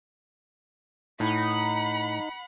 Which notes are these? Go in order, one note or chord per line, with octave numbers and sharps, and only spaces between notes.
A2 D#4 F#5 B5